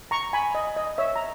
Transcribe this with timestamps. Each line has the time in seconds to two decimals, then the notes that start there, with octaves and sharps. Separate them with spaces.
0.11 A#5 C#6
0.33 G#5 B5
0.55 D#5
0.77 D#5
0.98 C#5 E5
1.16 A#5